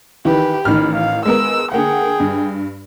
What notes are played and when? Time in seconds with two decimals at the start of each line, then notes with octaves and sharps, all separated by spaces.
0.25 D#3 E3 G4 B4
0.65 A1 D#3 B5 F6
0.94 F5
1.25 G#3 B3 A#4 E6
1.72 D3 A#3 G#4 F#5 G5
2.20 G2